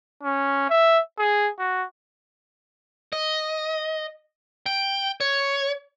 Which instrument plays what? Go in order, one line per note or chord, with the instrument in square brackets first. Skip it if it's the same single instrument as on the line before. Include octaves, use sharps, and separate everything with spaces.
[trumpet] C#4
E5
G#4
F#4
[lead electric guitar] D#5
G5
C#5